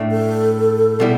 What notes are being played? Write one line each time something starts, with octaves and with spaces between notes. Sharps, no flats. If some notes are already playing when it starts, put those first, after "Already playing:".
Already playing: A2 A3 D4
A4
B2 G3 E4